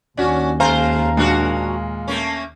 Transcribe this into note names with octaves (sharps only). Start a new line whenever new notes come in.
D#2 C#4 D4 F#4
G#3 C5 F5 G#5 A#5 C7
A#2 G#3 D4 F#4 A#4
A3 A#3 C#4